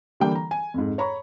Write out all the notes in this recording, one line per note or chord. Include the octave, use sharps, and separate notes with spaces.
D3 E3 G3 A#3 G5
A#5
G#5
F2 G#2
C#5 A#5 B5 C#6